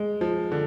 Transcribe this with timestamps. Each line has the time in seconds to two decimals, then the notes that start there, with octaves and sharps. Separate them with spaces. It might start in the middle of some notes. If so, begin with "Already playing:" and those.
Already playing: G#3
0.21 F3
0.52 D3